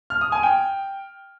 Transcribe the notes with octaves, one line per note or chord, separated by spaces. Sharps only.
F6
D#6
G#5
G5